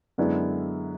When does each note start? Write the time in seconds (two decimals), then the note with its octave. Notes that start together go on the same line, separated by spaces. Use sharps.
0.18 F#2 D3 G#3 B3 E4